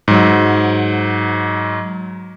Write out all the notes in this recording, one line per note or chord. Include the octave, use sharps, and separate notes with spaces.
G#2 F#3